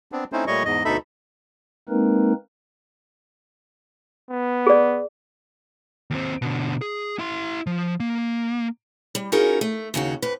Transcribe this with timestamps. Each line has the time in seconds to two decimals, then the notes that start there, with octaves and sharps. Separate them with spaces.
0.12 B3 C4 D4
0.32 A3 C4 C#4 D#4 E4 C5
0.47 A#2 G3 A3 C#5 D#5 C#6
0.65 E2 G#2 D#5
0.85 D2 B2 D#4 A4 E5 B5
1.89 G#3 A#3 C4 D#4 A#4 B4
4.30 B3
4.67 G#4 D5
6.11 D#2 C4
6.42 B2 D3
6.81 G#4
7.19 E4 C6
7.67 F3
8.00 A#3
9.15 G3
9.32 C#4 D#4 F4 F#4 G#4 A#4
9.61 A3
9.94 D#2 C#3 D#4 F#4
10.22 F2 B4